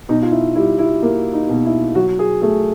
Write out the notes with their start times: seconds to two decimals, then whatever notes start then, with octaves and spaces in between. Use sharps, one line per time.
0.09 B2 D#4
0.22 F4
0.32 E4
0.55 G3 E4
0.79 E4
1.02 A#3
1.33 D#4
1.49 B2
1.65 E4
1.95 F#3 F#4
2.19 G#4
2.42 A3 G#4